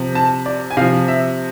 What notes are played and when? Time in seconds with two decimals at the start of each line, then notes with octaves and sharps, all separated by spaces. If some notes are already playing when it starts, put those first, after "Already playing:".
Already playing: C3 F3
0.15 A5
0.46 D5
0.70 G#5
0.77 C3 F3 F5
1.08 E5